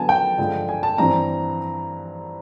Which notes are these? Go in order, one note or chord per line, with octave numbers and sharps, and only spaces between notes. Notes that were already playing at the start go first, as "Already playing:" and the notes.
Already playing: D3 F#3 B3 G#5 A5
G5
G2 D3 F3 G#3
G#5
A5
G2 E3 G3 C4 A#5